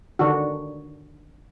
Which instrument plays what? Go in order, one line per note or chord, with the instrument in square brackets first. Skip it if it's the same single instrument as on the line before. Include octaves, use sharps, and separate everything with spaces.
[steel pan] D3 D#3 D4 F#4